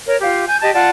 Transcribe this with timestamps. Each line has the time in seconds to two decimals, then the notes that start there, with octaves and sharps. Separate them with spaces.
0.07 A#4 C#5
0.21 F4 G4 F5
0.48 G#5 G6 G#6
0.61 G4 D#5 A5
0.74 F4 D5 F#5 A5